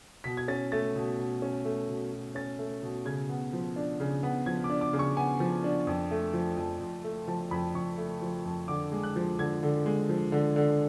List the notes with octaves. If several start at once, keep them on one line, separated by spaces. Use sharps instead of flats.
B2 B6
G#6
C#4 A6
A3 A6
B2
B2
C#4
A3
B2
B2
C#4 A6
A3
B2
C#3 G#6
B3
F3
D4
C#3
B3
F3 G#6
D6
D4
D6
C#3
C#6
B3 G#5
F3
D4
F2
A3
F3
F2
F2
A3
F3 A5
F2 B5
F2 C#6
A3
F3
F2
D3 D6
G#3
F#6
F3
D3 G#6
D3
G#3
F3
D3
D3